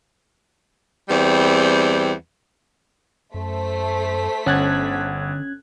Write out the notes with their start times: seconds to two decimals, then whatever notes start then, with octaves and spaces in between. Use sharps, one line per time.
1.09 E2 G3 C4
3.34 F#2 A3 C5 B6
4.46 G1 D3 C#4 F#5 F#6 G#6 A6